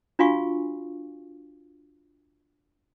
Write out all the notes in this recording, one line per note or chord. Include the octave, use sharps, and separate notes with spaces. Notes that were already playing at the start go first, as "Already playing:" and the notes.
D4 F4 F#4 F5 G#5 C#6